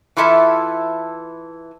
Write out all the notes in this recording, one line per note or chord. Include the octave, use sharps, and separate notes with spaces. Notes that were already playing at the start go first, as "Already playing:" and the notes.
E3 E4 F4 A4 E5 A5